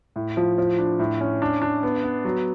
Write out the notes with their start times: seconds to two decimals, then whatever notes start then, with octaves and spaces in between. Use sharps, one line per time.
0.16 A2
0.37 F3
0.58 F3
0.79 D4
0.99 A2
1.21 C#4
1.42 D4
1.62 D4
1.83 B3
2.03 B3
2.25 F#3